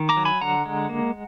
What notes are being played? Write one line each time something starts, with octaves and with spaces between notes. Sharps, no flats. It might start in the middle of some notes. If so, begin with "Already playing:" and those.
Already playing: D#3
A#5 D6
F#3
G#5 B5
D3 F#5 A#5
G#3
A#3